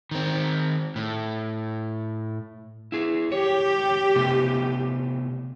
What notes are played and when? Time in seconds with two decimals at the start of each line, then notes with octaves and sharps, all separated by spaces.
0.11 D#3 C4
0.96 A2
2.92 E4 G#4
3.32 G4 C#5
4.16 C3 A3 B3